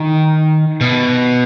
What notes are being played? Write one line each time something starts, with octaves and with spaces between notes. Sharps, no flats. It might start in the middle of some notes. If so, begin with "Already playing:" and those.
Already playing: D#3
B2